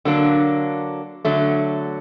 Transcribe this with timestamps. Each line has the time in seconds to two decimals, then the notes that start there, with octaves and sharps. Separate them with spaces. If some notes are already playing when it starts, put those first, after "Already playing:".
0.05 D3 F#3 A#3 D4
1.25 D3 F#3 A3